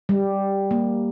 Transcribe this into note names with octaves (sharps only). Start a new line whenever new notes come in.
G3
A#3